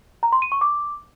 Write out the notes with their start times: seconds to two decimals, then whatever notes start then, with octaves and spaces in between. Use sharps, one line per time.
0.23 A#5
0.32 C6
0.42 D#7
0.52 C#6
0.61 D6